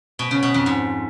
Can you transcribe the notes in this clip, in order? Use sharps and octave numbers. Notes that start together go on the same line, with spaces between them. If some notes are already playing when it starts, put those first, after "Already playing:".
B2
C#3
B2
F2
G#2